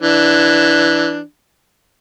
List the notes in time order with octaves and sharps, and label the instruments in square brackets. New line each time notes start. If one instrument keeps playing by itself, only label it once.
[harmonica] E3 D4